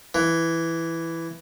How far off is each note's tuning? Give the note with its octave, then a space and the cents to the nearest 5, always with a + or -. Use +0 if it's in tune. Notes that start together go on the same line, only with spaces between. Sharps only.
E3 +5